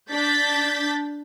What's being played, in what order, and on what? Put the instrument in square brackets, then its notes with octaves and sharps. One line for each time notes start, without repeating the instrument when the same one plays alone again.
[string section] D4 G6 A6 B6